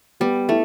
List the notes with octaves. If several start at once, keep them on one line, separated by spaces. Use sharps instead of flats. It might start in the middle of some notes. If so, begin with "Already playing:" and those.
G3 B3
A3 E4